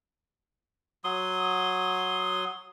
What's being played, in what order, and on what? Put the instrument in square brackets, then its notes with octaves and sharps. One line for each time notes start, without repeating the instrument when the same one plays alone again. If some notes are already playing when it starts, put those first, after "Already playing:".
[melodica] F#3 C6 D#6